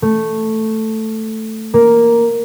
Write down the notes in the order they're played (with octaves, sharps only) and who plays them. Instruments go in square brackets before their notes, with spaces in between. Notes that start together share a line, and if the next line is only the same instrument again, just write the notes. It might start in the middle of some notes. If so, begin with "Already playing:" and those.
[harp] A3
A#3